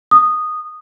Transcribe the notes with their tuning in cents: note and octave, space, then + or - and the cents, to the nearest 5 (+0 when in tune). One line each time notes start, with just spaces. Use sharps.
D#6 -10